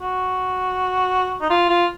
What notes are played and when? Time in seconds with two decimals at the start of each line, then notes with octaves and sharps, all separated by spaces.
0.01 F#4
1.41 D#4
1.50 F4
1.69 F4